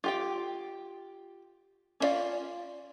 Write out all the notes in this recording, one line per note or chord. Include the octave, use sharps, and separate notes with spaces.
F4 G4 G5
C#4 D4 F4 D5 F5